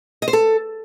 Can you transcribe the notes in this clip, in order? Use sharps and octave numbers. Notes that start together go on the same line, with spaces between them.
D#5
C5
A4